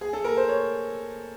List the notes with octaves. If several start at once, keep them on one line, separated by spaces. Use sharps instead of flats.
G#4
A4
A#4
C5
C#5